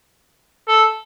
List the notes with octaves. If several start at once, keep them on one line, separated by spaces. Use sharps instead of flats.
A4